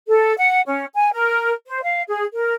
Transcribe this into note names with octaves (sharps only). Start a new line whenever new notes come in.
A4
F#5
C#4
G#5
A#4
C5
F5
G#4
A#4